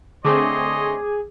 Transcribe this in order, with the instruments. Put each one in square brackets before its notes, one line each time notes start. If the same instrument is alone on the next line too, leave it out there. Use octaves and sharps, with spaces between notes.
[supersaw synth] D3 A3 C4 [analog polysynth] G#4 [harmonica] C#5 D#5 C6 [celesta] D6